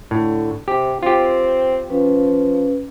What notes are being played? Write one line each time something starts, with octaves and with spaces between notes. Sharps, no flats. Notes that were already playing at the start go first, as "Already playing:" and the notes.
A2 D3
C3 G4
C4 F4 G4
F3 C#4 B4